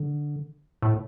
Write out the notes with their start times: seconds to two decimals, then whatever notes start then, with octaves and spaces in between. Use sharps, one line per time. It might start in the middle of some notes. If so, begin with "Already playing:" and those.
Already playing: D3
0.82 A2